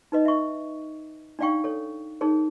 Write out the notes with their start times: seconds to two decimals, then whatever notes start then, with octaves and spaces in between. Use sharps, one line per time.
0.12 D#4 B4 D#5
0.25 E5 C#6
1.39 D4 D#4 D5 F5 G5 C#6
1.64 A4 C#5
2.21 D#4 G#4 A#4 C#5